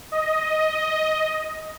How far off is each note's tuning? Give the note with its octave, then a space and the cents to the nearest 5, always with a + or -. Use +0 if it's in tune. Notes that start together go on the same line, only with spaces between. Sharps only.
D#5 +10